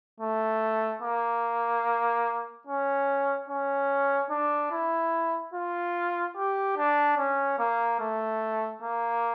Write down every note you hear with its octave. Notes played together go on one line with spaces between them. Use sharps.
A3
A#3
C#4
C#4
D4
E4
F4
G4
D4
C#4
A#3
A3
A#3